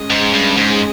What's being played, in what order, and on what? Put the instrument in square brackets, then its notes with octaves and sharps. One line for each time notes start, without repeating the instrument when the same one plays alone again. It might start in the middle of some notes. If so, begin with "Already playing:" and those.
Already playing: [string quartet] G#3 C#4 G#4 D#5
[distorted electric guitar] G#2
G2
G#2